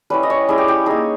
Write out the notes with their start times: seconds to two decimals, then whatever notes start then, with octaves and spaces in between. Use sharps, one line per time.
0.10 G3 C#4 E4 B4
0.23 D#5
0.30 C#5
0.48 G3 C#4 E4 G#4
0.58 G4
0.68 G4
0.86 A#3 D#4 G#4